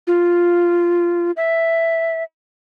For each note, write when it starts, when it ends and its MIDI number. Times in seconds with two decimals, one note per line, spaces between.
0.07 1.31 65
1.36 2.23 76